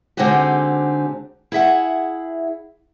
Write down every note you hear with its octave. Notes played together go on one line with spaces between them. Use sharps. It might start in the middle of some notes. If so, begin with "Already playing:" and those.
D3 G#3 C4 D#4 F#4 G4
E4 G#4 E5 F#5